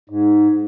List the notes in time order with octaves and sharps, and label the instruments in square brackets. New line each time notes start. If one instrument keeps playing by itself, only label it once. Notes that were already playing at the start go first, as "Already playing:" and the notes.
[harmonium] G#2